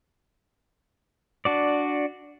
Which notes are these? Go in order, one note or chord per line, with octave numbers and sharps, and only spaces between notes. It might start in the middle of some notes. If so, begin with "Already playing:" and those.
D4 F#4 D5